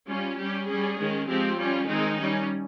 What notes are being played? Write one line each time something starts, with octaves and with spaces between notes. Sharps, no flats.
G3 C#4 F4
G3 C#4 G4
G3 C#4 G#4
D#3 G#3 C#4
F3 G#3 C4 G4
G3 C#4 F4
D#3 G#3 C4 D#4
G3 C#4